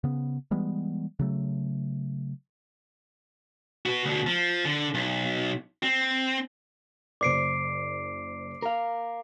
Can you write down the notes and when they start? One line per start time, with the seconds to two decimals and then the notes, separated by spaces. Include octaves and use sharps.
0.04 C#3 B3
0.51 E3 G3 G#3 B3
1.19 C#3 F#3 A3
3.86 F#4 B4
4.05 D2 B2
4.27 F3
4.65 D3
4.94 B1
5.83 C4
7.21 F#1 C5 D5 D6 C7 D7
8.62 A#4 F5